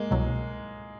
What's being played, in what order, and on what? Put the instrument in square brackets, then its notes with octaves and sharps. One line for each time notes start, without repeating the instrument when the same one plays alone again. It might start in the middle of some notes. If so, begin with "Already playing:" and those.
Already playing: [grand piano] G#3 A#3
[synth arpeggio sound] C2 B2 F#3